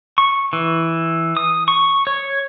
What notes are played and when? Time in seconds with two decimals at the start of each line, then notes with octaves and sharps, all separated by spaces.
0.18 C#6
0.53 E3
1.37 D#6
1.68 C#6
2.07 C#5